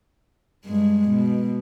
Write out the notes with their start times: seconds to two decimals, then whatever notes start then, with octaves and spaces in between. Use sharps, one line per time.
0.66 G2 G#3
1.08 B2